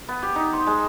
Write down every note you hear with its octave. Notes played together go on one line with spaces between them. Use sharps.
B3
G4
D#4
C5
G#3